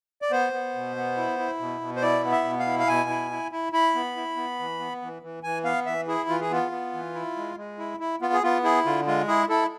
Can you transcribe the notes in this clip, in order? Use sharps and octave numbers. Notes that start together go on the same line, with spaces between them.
D5
B3 C5
B3
B2
B3
E4
E4
B2
B2
C5
E4 D5
B3
E5
B2
F5
E4
F5
B2 G#5
E4
E4
E4
E4 B5
B3
E4
B3
E3
B3
E3
E3
E3 G#5
B3 F5
E3 E5
E4 G#4
E3 F4
G#4
B3 F4
B3
E3
E4
G#3
G#3
E4
E4
B3 F4
G#4
B3 F4
E4 G#4
D3 F4
G#3 F4
E4 G#4
E4 A4